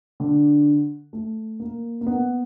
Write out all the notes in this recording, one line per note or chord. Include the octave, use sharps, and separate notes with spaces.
D3
A3
A#3
A#3
B3